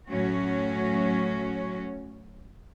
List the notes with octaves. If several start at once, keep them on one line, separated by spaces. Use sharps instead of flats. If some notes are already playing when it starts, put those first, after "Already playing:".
A2 F#3 C#4 F#4